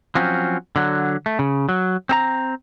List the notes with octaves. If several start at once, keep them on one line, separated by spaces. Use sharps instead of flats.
F3 F#3 C4 C#4
D3 F#3
A3
C#3
F#3
C4 A4 A#5